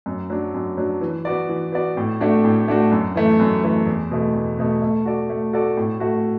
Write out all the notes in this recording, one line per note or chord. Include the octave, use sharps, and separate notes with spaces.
F#2
F#3 D4
F#2
F#3 D4
E3
B3 F#4 D5
E3
B3 F#4 D5
A2
A3 D4 F#4
A2
A3 D4 F#4
F#2
E3 A3
F#2
E3 A3
E2
B2 A3
E2
B2 A3
A3
F#4 A4 D5
A3
F#4 A4 D5
A2
A3 F#4